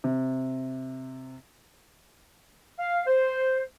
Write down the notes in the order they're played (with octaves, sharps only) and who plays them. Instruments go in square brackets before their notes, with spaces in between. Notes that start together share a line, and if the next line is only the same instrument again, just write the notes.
[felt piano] C3
[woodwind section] F5
C5